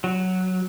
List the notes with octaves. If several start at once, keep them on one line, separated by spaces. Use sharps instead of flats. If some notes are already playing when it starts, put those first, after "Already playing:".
F#3